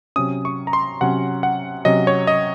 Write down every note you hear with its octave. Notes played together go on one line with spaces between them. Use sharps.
C3 F#3 C#4 D#6
C#6
A#5
C6
C3 F#3 C#4 F#5
F#5
C3 F#3 C#4 D#5
C#5
D#5